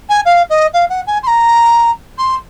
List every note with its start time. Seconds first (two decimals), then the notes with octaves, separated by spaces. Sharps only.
0.09 G#5
0.25 F5
0.49 D#5
0.73 F5
0.89 F#5
1.06 G#5
1.22 C6
1.27 A#5
2.18 C6